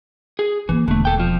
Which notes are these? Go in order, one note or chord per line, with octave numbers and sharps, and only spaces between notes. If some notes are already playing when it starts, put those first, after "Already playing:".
G#4
E3 A#3 C#4
E1 D3 A3
A4 G5
F2 F3